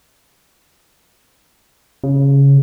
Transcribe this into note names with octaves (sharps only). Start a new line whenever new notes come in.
C#3